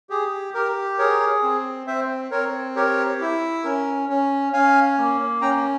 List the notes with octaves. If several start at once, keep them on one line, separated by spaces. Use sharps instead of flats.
G4 G#4
G4 A#4
G#4 A#4 C#5
C4
C4 C5 E5
C4 A#4 C#5
G4 A#4 C#5
E4
C#4 A#4
C#4
C#4 F5 G#5
A#3
C#4 G5 A#5